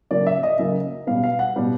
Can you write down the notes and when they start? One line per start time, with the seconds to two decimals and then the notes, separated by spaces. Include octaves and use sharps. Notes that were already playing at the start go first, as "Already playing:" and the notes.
0.11 C#3 F#3 A#3 D5
0.27 E5
0.43 D#5
0.58 C#3 F#3 A#3
1.07 B2 G3 B3 F5
1.24 F5
1.39 F#5
1.56 B2 G3 B3